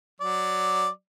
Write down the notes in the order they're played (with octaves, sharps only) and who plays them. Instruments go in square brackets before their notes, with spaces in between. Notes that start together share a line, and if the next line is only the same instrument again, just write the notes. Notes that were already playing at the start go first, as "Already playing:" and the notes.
[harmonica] F#3 D5